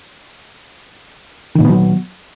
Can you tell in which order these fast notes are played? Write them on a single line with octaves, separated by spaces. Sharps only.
D#3 A#2 B3 F#3